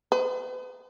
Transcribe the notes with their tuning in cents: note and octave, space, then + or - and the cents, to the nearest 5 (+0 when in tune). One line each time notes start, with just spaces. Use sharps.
B4 +45